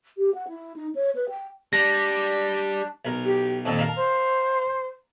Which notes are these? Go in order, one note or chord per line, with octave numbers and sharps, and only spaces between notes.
G4
F#5
E4
D#4
C#5
B4
G5
G3 D4 A#6
B1 A#4
G4
F2 A#2 D#3 A5
A#4 F5 A#5
C5